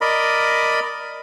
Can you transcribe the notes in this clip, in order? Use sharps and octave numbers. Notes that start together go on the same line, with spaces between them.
A#4 D5 D#5 B5